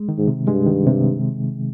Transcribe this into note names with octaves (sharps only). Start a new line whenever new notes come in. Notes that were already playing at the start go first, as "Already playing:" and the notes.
Already playing: G#3
D#3
G#2
C3
G2 G#3
D#3
C3